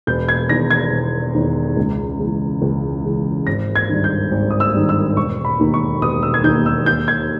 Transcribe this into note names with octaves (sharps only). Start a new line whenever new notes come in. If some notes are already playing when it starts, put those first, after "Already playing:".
E1 G6
G#6
E2 D#3 A#6
G#6
E1
E2 D#3
C#2
C#3 E3
C#2
C#3 E3
G#1 A#6
G#6
G2 D#3
G6
G#1
D#6
E6
G2 D#3
E6
E1 C#6
B5
D#2 D#3
C#6
E1 D#6
E6
G#6
D#2 D#3 G6
E6
D#2 G6
G#6